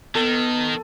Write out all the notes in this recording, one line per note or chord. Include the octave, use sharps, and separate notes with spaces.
D#3 B3 A4